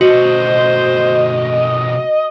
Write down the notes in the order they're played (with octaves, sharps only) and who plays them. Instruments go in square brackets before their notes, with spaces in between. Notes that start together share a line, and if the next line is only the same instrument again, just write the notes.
[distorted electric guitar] B2 A3 [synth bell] F#4 [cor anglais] C5 [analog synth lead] D#5